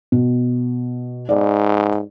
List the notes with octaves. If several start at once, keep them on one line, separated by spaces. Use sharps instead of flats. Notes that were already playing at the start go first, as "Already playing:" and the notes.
B2
G#2 D5